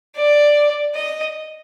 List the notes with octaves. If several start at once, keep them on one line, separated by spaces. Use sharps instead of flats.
D5
D#5